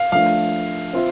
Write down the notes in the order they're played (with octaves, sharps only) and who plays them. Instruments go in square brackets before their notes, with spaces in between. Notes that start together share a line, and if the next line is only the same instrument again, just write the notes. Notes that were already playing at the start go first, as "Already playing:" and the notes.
Already playing: [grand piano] F5
[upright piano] F3 A3 D4 [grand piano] F5
[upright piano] C4 F4 C5 E5